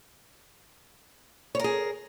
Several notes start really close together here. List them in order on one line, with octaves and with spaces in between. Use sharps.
C#5 A#4 G#4